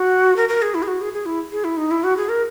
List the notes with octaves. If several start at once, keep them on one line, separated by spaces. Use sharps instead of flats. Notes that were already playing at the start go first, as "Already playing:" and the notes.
Already playing: F#4
A#4
A#4
G#4
E4
G#4
F#4
G#4
G#4
E4
G#4
E4
D#4
E4
F#4
G#4
A#4